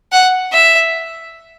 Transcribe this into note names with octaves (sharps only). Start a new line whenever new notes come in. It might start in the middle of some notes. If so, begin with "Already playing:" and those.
F#5
E5